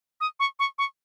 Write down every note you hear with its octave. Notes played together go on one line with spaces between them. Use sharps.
D#6
C#6
C#6
C#6